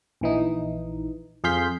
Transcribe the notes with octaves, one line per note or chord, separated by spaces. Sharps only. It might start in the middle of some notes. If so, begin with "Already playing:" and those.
A#1 E3 D#4
F2 G#4 F5 C6 G6 B6